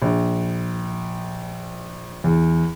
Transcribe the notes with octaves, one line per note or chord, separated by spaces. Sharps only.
A#1
E2